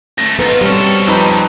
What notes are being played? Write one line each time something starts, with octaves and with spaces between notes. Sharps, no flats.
C#2 A3 A#6
G#2 B3 D#4 F4 A4
B2 G3 C4 C#4 A4
F2 D#4 B4